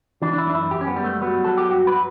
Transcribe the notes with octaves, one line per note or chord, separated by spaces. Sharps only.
E3 D4
D4
E4
F#2 D4
E4
F#2 G4
C#4
B3
G3
A3
F#3 B3
F#3 A4
G4
G2 F#4
B4